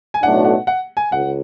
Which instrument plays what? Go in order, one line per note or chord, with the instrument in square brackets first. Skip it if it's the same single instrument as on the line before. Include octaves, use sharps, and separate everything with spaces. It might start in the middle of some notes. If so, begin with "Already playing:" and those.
[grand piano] G#5
[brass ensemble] B1 A2 F#3 A3 D4 [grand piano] F#5
[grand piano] F#5
F#5
G#5
[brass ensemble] C#2 [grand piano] F#5